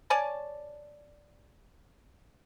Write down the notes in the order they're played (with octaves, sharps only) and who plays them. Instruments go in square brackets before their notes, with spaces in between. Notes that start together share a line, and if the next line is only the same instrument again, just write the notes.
[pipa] C#5 D5 G#5 A5